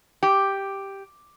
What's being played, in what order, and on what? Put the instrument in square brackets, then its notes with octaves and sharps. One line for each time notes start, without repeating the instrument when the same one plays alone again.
[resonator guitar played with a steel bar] G4